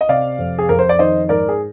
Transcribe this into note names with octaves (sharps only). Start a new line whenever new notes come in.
D#5
C3 D5 F5
F2
G#4
F2 A#4
C5
D5
D#3 C5 D#5
G#2 A#4 D5
G#4